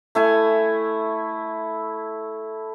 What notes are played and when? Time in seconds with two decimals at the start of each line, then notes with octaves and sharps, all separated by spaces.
0.15 A3 E4 G#5